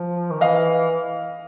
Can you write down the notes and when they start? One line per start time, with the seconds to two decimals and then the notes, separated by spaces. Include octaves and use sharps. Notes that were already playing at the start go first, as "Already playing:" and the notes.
Already playing: F3
0.31 D#3
0.41 E3 D#5 F5